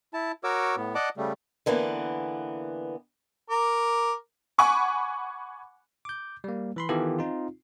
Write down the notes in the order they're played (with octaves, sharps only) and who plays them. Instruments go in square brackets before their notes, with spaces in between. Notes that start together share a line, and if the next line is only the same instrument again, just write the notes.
[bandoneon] E4 A5
F#4 A#4 C#5 D6 E6
A2 B3
D5 D#5 F#5 A5 D6
C#3 G3 A3
[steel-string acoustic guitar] D3 E3 A#3 B3
[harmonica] A#4 D6
[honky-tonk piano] F#5 G#5 B5 C#6 D6
[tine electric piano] D6 G6
G3 A#3
E3 B5 C6
D#3 E3 B3 F4 G4 A4
C4 D#4 F4